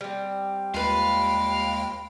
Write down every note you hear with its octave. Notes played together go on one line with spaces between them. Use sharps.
G3 C4
D#2 G#3 F4 B4 F5 G5